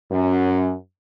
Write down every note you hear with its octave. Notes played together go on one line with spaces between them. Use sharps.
F#2